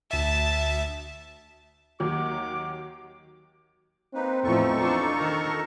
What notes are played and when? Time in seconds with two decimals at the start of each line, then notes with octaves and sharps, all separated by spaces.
0.11 D2 E5 A5
2.00 D#2 D#3 F#3 F#5 D6
4.14 A#3 C4 D#4 B4
4.44 E2 A2 F3 D#4 A4 C#6
4.80 D4 F4
5.17 D#3 A#4